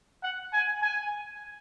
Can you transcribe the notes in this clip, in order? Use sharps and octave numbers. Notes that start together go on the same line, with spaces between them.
F#5
G#5
G#5